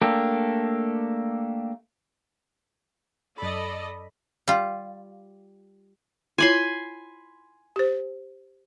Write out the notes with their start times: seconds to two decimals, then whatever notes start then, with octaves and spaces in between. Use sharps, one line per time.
0.02 A3 A#3 D4 G4 A4
3.38 F#2 A4 D5 D#5 B5
4.48 G3 F4
6.38 E4 F4 C#5 G#5 B5 C6
7.76 G4 C5